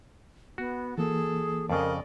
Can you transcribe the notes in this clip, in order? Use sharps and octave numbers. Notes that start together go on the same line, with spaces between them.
B3 F#4
E3 A#3 G#4 A4
F2 C#3 A#4 D5 D#5